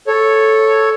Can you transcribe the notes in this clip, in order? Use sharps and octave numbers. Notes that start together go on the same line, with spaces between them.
A4 C#5